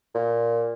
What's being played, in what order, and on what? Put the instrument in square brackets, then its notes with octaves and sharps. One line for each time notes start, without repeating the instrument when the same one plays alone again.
[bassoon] A#2